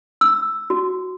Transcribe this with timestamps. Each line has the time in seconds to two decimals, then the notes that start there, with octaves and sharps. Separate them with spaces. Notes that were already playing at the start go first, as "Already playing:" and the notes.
0.21 E6
0.70 F#4